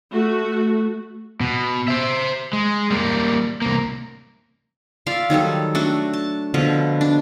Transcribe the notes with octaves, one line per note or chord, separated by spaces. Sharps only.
A3 F#4
B2
C5 E5
G#3
G3 A#3
C2 A#3
F4 D5 E5 F5
D#3 F#3 G3 A4
A3 D4 F#4
A5
B2 D3 F3
D4